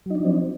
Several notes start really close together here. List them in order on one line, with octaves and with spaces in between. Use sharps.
F#3 D#4 D4 F3 C4